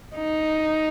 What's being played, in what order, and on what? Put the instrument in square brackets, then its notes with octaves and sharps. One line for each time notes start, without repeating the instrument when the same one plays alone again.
[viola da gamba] D#4